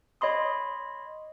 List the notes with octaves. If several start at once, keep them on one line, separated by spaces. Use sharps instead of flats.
C#5 D#5 B5 C6 D#6